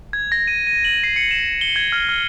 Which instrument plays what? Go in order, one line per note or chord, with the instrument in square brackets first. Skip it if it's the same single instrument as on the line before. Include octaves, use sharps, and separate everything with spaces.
[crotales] G#6
A#6
D#7
D#7
F#7
C7
C#7
E7
G7
G#6
F6
F6